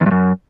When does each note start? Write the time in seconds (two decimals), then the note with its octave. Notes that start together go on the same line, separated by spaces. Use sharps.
0.01 E2
0.06 G2
0.11 F#2